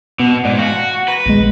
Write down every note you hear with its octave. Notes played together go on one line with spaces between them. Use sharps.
B2 B3
G#2 D5
F#4 F5 G5 A5
B4 A#5 A#6
A#1 D#2 G#3